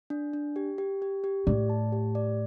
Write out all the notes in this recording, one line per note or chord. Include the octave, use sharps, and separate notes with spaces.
D4
D4
G4
G4
G4
G4
A2 D5
A5
G4
D5